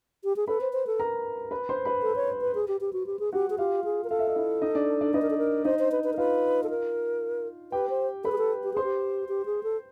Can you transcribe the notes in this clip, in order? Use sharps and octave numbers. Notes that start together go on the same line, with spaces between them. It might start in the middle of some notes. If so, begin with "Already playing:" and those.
G4
G#4
A4 B4 B5
C5
C5
A4
A#4 A#5
B4 B5
C5 C6
B4 B5
A4
C#5
B4
G#4
G4
G4
F#4
G4
G#4
F#4 G4 F#5
G#4
F4 G4 F5
G#4
A#4
A4 F5
E5
D#5
E4 E5
D#4 D#5
D4 D5
D4 D5
D#4 B4 D#5
A#4
A4
A#4
D#4 C5 D#5
C5
B4
B4
A#4
F4 B4 F5
A4
A#4
G4 B4 G5
C5
A4 B4 B5
G#4
A4
G4
G#4 C5 C6
G4
G4
G#4
A4